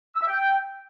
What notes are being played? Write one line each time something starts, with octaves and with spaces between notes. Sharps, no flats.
E6
E5
G5